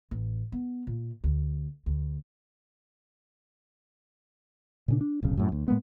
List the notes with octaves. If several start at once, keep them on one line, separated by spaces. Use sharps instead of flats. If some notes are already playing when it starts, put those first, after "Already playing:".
A1
B3
A#2
D2
D2
A#2 C#3 D4
D4
D1 B1 C#3
F#2 A2
D2
A2 G#3 A#3 B3